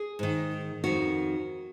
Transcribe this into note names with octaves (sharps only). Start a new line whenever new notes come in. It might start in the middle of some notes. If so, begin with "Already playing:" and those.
Already playing: G#4
G#2 D#3
F2 D#3 F#4